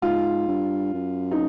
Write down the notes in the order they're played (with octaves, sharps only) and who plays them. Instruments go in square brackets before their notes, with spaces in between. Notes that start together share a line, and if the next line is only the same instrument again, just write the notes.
[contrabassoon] G#2 [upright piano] F4
[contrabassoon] G2
F#2
[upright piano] D#4